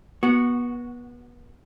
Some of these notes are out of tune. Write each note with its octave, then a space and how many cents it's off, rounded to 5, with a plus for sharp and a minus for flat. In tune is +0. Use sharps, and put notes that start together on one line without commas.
B3 -30 F#4 +0